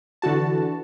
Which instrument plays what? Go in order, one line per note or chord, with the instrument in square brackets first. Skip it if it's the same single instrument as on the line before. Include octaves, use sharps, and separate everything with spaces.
[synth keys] D3 E3 F#4 A5